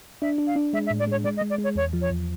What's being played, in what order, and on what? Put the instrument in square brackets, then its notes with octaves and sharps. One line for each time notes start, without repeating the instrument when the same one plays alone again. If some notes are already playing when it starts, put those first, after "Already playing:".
[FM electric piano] D4 [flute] E5
[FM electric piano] D4
[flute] F5
[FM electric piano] D4
[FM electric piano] G#3 [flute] E5
[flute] E5
[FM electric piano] A2
[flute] D5
[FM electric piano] G#3 [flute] C#5
[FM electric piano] G#3 [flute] D5
[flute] D#5
[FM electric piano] G#3
[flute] D5
[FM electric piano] G#3
[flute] C#5
[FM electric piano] E2 [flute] C#5
[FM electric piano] F3
[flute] C#5
[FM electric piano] E2